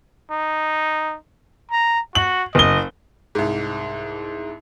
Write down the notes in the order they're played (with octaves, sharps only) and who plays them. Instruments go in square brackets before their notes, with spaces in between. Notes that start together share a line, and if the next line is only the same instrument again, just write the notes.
[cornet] D#4
A#5
[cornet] F#4 [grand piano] F#7
[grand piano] F#1 G7 [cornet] D#5
[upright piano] C2 G#2